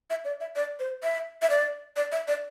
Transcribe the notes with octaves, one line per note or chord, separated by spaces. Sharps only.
E5
D5
E5
D5
C5
E5
E5
D5
D5
E5
D5